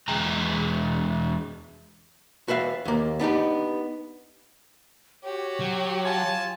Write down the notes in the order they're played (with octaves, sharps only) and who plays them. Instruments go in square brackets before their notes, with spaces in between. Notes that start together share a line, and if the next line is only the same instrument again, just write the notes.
[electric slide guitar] E2 G#3 G5 A#5
[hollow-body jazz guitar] F#4 B4 E5 F5
D#2 A#3
B3 D4 D#4 G4
[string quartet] F#4 G4 [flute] C#5
[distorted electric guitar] F#3
[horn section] F4 G#5 A5